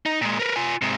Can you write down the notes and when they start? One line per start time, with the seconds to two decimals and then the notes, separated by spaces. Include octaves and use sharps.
0.06 D#4
0.21 A#2 G#3
0.39 A#4 B4
0.56 F4 G#5
0.82 G#2 C3